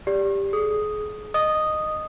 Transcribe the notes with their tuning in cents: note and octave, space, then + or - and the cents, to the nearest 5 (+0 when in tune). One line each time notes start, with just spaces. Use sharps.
G4 +10 D5 -20
G#4 +30 D#6 +0
D#5 -15 D#6 -5